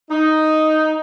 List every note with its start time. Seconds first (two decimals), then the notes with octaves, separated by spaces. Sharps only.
0.10 D#4